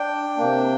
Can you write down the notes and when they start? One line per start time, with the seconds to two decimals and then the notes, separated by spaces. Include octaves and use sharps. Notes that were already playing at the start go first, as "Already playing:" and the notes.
Already playing: D4 G5
0.36 C3 A#3 D4